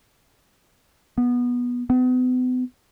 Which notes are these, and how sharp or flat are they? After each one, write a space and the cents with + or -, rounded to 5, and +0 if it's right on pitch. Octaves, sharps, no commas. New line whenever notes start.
B3 -15
B3 +40